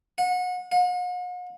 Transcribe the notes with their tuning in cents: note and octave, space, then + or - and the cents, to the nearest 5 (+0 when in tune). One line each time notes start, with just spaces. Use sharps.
F#5 -30
F#5 -45